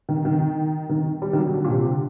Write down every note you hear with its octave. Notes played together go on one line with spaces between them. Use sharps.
D#3
D#3
D#3
G3
D#3
F#3
D3
A#2
C3
D3